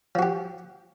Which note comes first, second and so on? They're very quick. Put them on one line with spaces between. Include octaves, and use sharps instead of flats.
F3 F#4 G4